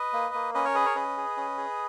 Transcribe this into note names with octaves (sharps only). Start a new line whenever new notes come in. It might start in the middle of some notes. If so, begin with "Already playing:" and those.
Already playing: B4 D#5
A#3
A#3
C#4 B4 D#5
A#4 C#5
G#4 B4 D#5
A#4 C#5
C#4 B4 D#5
G#4
C#4
G#4